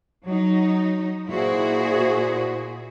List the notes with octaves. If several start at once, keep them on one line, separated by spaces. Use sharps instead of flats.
F#3 D#4
A#2 E4 F#4 G#4 C5